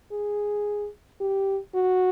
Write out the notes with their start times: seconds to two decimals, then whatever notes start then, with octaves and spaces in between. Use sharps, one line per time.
0.12 G#4
1.21 G4
1.75 F#4